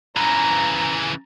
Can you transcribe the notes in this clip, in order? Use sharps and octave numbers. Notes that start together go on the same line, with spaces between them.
C#3 E3 A#5